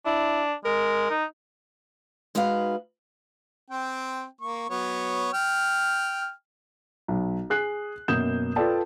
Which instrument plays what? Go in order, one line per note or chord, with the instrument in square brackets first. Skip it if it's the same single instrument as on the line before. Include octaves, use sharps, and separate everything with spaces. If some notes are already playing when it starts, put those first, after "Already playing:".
[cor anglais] D4 [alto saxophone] E4
[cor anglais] G#3 [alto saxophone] A#4
[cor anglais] D#4
[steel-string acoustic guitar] G#3 D#4 F#4 B4 F5
[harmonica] C4 G5
A#3 C#6
F#3 B3 C#5
G5 F6
[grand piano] B1
G#4 F#6 C7
F#2 B2 A#3 D#6 G6 E7
F4 A4 B4 D5 G5 A5